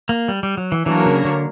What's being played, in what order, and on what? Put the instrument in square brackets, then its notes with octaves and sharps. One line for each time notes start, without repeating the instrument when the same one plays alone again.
[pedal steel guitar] A#3
G3
G3
F#3
E3
[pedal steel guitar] E3 [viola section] F#3 A#3 D4 A#4 C#5
[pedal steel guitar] C#3
D3